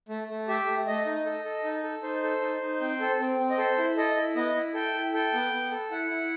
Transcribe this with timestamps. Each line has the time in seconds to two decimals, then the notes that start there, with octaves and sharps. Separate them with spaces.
0.09 A3
0.28 A3
0.48 G4 E5
0.67 A3
0.87 A3 D#5
1.06 D#4
1.26 A4
1.45 A4
1.64 D#4
1.83 A4
2.03 D#4 C5
2.23 A4
2.42 D#4
2.61 D#4
2.81 C4
3.00 A4
3.20 C4
3.39 C4
3.50 D#5
3.58 A4 C5
3.78 E4
3.97 A4 D#5
4.17 E4
4.35 B3 D#5
4.55 E4
4.74 A4 G5
4.94 E4
5.14 A4 G5
5.33 B3
5.52 B3
5.71 A4
5.91 E4 F#5
6.11 E4